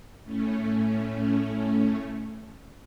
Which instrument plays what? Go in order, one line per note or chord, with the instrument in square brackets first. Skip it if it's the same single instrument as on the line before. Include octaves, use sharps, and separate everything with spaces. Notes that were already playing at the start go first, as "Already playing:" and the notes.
[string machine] A2 A3 C#4